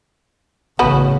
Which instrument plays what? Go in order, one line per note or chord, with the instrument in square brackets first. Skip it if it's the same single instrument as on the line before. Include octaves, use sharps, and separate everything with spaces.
[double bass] A1 C#3 [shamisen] B3 F#4 B4